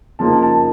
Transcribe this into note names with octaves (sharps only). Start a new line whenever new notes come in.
C#3 F3 A#3 D#4 A5
A5